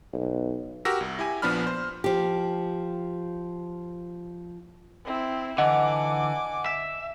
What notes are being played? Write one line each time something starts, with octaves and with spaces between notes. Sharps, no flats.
B1
F#4 G4 A#4 E6 A#6
C2
E4 G4 G#5
A#1 F3 B3 D4 B5 F6
C5
F3 G4
C4 E4
D3 E3 D#5 F#5 G#5 D6
E5